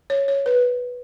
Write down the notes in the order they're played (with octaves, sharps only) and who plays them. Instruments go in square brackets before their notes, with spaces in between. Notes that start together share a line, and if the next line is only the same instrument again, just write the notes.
[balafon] C#5
C#5
B4